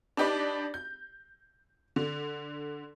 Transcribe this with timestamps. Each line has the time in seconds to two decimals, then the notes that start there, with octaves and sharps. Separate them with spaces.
0.17 D4 D#4 G4 B4 D5
0.74 G6
1.96 D3